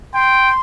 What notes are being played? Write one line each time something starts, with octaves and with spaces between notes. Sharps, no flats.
G5 C6